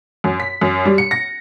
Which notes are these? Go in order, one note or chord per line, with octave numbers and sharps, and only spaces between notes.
F#2
B6
F#2
G3
C#7
A#6